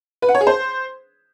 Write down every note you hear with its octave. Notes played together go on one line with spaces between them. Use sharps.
B4
F#5
C#5
G#4
C5